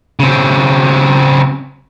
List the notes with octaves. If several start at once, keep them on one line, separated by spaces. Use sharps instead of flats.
C#3 C4